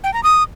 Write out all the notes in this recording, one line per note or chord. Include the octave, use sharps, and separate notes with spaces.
G5
A#5
D#6